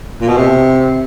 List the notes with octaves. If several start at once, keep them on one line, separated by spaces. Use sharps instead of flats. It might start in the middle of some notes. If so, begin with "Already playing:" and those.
A#2
B2
C3